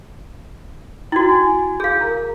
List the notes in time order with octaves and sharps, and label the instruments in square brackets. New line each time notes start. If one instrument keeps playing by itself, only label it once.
[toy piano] E4 F#4 [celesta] G5 G#6
[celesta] G#5
[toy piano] G#4 F5 [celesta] G6
[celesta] A#4 A#5